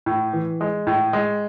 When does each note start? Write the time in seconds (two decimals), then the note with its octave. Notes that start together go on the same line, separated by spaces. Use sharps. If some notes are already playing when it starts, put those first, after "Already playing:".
0.06 A2
0.33 E3
0.61 G#3
0.87 A2
1.13 G#3